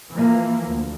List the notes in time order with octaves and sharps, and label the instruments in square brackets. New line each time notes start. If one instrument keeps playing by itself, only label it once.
[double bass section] E3 F3 A#3
D2